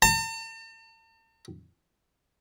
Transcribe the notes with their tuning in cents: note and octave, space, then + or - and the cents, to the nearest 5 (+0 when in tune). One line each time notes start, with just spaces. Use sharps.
A5 +45